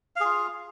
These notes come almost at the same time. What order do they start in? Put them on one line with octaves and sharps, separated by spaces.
F5 G#4 F4